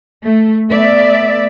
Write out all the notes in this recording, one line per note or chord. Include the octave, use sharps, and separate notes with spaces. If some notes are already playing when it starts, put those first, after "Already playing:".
A3
A3 B3 D5 E5